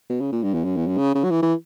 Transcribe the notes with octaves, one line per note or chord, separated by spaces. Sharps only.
B2
C#3
A#2
G2
E2
F#2
E2
F#2
C#3
C#3
F#3
E3
E3